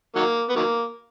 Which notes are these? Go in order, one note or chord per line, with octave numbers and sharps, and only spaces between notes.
D#3 F#3 A#3
B3
D#3 F#3 A#3